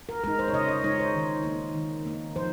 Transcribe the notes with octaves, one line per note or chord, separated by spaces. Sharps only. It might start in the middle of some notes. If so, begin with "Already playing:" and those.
A#4
G#3 D#4 A#4
C5
C#5
C#3 D#5
D#5
G#3 D#4 C#5
C5
D#3
A#3 D#4
D#3
A#3 D#4
F3 C5